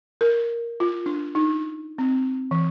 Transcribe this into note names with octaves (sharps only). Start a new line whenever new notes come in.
A#4
F4
D4
D#4
C4
E3